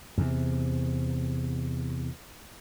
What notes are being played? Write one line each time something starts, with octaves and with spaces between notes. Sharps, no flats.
E2 C3